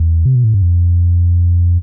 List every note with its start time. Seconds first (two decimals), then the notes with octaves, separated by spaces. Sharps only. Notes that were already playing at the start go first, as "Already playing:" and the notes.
Already playing: E2
0.26 C3
0.35 B2
0.44 A2
0.54 G2
0.62 F2